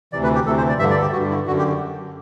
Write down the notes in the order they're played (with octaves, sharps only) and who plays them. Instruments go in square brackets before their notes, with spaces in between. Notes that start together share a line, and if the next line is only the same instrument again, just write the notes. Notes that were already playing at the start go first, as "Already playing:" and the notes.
[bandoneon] D2 C3 E3 D5
B4
G4
D2 C3 E3 A4
C5
D5
G2 E5
D3
D5
A4
G4
G2 D3 F#4
E4
D3 F#4
F#2
G4